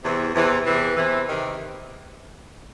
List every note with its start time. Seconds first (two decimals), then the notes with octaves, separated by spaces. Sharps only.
0.02 E2 C3 E3
0.33 E2 C3 E3
0.65 E2 C3 E3
0.96 E2 C3 E3
1.28 C3 D#3